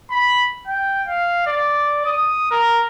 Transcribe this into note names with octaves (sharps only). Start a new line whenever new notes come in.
B5
G5
F5
D5
D#6
A#4